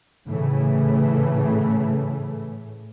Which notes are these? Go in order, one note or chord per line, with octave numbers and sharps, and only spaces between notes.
A2 C#3 E3 A3